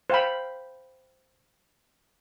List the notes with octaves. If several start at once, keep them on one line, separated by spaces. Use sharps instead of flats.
C5 F5 G5 B5